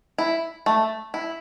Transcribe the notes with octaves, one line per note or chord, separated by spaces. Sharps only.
E4
A3
E4